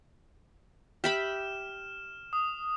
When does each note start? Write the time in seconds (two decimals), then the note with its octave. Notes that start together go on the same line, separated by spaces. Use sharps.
1.04 G4 E5 B5 F6 E7
2.33 D#6